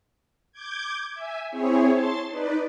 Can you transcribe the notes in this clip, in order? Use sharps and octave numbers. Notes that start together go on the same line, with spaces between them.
D6 G6 G#6
E5 G#5
C4 E4 G#4 C#5
A5 C6 A6
D#4 B4 D5